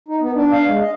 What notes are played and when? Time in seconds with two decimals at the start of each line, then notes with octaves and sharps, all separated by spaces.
0.08 D#4
0.21 B3
0.35 D4
0.52 F5
0.67 G#3
0.81 D#5